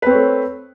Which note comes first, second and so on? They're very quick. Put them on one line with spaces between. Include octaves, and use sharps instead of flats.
B4 C4 C#5 A3